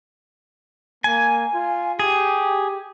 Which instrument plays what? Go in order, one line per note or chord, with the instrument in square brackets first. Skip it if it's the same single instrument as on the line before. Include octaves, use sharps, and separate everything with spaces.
[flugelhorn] A#3 [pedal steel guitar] G#5
[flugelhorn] F4
[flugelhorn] G4 [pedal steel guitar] G#4